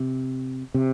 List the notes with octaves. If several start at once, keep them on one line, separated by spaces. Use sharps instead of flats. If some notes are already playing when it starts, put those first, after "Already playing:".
Already playing: C3
C3